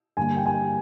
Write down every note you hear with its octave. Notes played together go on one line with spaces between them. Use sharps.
G2 D3 G3 A#3 G#5
G5
G#5